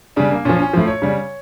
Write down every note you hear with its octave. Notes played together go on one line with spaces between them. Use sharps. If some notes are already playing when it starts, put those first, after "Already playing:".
C#3 G3 D4
A#3
A#2 F3 C#4
C#4
A2 F3
C#5
C#3 G3